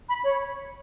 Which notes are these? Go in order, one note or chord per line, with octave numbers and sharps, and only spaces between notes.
B5
C#5